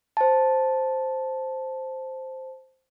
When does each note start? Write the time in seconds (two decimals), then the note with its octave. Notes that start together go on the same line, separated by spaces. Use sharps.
0.17 C5 A5